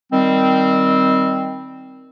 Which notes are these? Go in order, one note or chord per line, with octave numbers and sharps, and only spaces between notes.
D#3 G3 C4